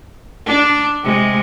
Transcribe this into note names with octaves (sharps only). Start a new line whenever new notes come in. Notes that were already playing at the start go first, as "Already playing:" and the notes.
D4
C3 G#3